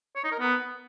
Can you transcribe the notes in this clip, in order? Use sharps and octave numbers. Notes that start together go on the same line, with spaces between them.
C#5
D#4
A#4
B3